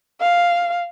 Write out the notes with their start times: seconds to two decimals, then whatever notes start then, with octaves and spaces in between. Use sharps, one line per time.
0.20 F5